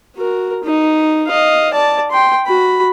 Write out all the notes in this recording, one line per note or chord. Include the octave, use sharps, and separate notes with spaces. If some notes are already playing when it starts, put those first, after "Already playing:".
F#4 A#4
D#4
D#5 F5
D5 A5
G5 C6
F#4 B5